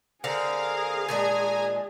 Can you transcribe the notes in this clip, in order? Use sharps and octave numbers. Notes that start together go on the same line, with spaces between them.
D3 C4 G#4 A#4 F5
A#2 D#3 G#3 D4 G#5 A#5